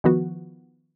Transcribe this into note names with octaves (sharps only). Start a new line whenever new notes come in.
D#3 F3 B3 F#4